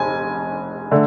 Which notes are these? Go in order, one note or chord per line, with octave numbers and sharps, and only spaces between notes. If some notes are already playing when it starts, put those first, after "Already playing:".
Already playing: F1 G#5
D3 A3